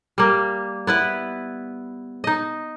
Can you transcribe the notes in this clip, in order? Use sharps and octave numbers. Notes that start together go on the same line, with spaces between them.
G3 A#3
B3 E4 B4
D#4 D#5